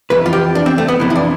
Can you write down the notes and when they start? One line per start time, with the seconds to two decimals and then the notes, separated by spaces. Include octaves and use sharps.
0.10 F2 E3 B4
0.26 F4
0.33 G4
0.55 D4
0.66 C4
0.78 A3
0.88 B3
1.00 F2 C3 E3
1.10 E4
1.16 D4